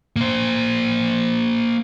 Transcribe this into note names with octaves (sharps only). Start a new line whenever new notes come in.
A#3 C5